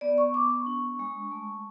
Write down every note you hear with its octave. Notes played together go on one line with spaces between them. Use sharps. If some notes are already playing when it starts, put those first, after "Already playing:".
B3 D5
C#6
B3 D6
C#6
D4
G#3
A3